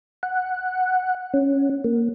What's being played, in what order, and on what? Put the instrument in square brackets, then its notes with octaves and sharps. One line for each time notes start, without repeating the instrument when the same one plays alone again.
[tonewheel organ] F#5
C#4
A#3